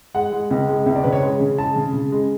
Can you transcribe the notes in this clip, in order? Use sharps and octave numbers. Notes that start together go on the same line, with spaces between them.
G#3 F#5
G#3
C#2
G#3
C#2 E5
D5
C#3 B4
C#5
G#3
C#3
G#3 A5
C#3
C#3
G#3